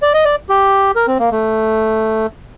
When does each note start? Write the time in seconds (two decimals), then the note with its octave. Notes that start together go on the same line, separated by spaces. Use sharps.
0.02 D5
0.14 D#5
0.25 D5
0.49 G4
0.96 A#4
1.07 C4
1.19 A#3
1.31 A3